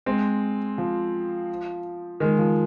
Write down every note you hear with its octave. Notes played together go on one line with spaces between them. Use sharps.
G#3 C4
F3
D#3 G#3
F3